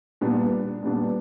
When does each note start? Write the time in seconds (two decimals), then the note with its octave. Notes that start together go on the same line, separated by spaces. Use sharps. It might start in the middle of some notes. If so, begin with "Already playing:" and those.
0.21 A#2 G3 B3 D4
0.83 A#2 G3 B3 D4